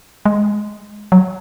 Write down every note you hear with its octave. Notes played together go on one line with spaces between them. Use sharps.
G#3
F#3